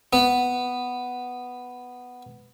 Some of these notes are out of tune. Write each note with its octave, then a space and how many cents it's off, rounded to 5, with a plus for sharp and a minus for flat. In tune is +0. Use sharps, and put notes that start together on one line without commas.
B3 +5